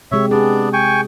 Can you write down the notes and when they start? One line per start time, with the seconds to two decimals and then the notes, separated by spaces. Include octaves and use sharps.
0.12 C3 G#3 G4 C#5 E5
0.31 B3 D4 G4 G#4 D5
0.73 G5 G#5 C#6